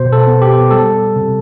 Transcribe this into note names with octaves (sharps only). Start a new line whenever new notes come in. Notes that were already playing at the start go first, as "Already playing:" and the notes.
Already playing: B2 C5
A4
B3
G4
G3 A4
C3